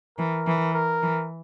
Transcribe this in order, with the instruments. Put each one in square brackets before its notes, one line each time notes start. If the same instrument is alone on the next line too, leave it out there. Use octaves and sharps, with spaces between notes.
[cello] E3 [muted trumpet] A#4
[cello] E3
[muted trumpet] A#4
[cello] E3